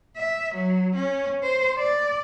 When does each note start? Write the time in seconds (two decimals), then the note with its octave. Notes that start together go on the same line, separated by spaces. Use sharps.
0.17 E5
0.55 F#3
0.96 C#4
1.43 C5
1.78 D5